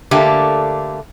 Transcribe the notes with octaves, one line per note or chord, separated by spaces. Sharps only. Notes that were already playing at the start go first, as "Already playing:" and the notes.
D3 A3 A#3 G4